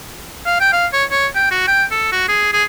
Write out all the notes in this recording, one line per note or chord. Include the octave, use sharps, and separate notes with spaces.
F5
G5
F5
C#5
C#5
G5
F#4
G5
A4
F#4
G#4
G#4